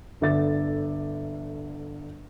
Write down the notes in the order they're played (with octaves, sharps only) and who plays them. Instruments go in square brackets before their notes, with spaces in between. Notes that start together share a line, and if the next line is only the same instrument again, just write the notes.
[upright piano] G1 D3 E5 D6 A6